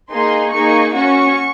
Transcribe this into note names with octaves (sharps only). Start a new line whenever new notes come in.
A#3 D#4 G#4 C6
A#3 D#4 G#4 C#6
C#4 F#4 C#6